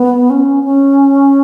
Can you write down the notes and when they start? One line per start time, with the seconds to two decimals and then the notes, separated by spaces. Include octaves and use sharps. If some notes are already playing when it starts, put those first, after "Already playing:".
Already playing: B3
0.30 C#4
0.64 C#4